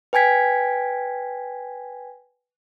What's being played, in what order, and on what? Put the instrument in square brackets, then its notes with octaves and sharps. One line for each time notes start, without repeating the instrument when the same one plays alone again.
[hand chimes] B4 G5 G#5 G#6 B6